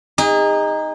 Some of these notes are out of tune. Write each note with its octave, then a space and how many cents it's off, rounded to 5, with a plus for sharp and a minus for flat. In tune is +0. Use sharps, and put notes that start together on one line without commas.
D#4 +0 G#4 -40